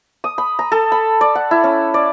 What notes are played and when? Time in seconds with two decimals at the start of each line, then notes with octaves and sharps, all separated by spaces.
0.24 D#6
0.38 B5
0.59 A#5
0.72 A4
0.92 B5
1.21 D5
1.35 F#5
1.51 E4
1.64 C#4
1.94 D5